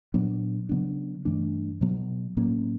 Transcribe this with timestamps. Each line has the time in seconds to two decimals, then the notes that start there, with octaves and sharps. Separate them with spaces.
0.14 A#2 F#3 B3 D4
0.69 C#3 F#3 B3 D4
1.25 G2 E3 A3 D4
1.81 B2 F#3 B3
2.37 A2 F#3 A#3 C#4